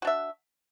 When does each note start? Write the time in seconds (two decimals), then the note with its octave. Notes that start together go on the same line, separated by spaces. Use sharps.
0.02 F#4
0.05 D4
0.07 E5